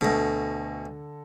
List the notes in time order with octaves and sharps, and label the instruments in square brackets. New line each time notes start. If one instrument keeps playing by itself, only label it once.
[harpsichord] D2 B2 [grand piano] D3 A4 A#6